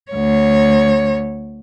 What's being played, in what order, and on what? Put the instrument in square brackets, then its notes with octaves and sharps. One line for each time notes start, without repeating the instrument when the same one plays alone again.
[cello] D2 C#5